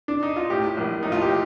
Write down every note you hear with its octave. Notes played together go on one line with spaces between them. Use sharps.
D4
D#4
F4
A2 G4
A#1
A2 D#4
F4
G4